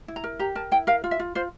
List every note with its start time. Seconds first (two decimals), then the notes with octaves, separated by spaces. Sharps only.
0.08 E4
0.16 A#5
0.24 A#4
0.39 G4 A#5
0.55 A#4 A5
0.71 E4 G5
0.87 A#4 F5
1.04 F4
1.11 E5
1.20 F4
1.35 F4 C5